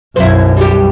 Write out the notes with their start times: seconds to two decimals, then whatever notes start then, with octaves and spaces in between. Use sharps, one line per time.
0.16 B1 F#2 E4 C5
0.57 G3 G4